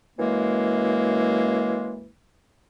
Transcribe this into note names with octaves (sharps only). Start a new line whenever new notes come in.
F#2 E3 G#3 A#3